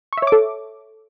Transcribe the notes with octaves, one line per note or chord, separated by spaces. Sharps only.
A4 C#5 E5 C#6 D6